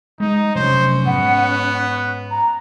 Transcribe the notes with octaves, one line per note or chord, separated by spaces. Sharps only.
G#3 D#4
F1 F#3 C#4 C5
G#2 B3 F#5
F#6
A#5